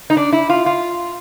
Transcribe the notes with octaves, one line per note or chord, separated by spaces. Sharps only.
D#4
D4
E4
F4
F4